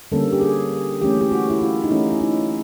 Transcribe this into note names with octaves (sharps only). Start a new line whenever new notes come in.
D3 G3 A#3 C#4 A4
G4
G#4
E3 A3 C#4 G4
G4
F#4
E4
F4
D#4
E3 A3 C#4 E4
E4
D#4